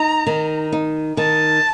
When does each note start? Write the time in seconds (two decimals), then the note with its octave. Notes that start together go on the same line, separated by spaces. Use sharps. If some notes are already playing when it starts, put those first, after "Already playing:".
Already playing: D#4 A#5
0.27 D#3
0.72 D#4
1.17 D#3 A5